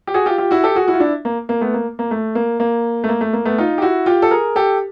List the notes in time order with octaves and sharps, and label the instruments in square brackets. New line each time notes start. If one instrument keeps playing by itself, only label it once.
[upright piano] G4
F#4 G#4
F4 G4
F4 G4
E4 F#4
G4 A4
F#4 G#4
E4 F#4
F4
D4 E4
A#3
A#3
A3 B3
A#3
A#3
A3
A#3
A#3
A3
A#3
A3
A#3
A3 B3
D#4 F4
G4
E4 F#4
F4 G4
A4
G#4 A#4
G4 A4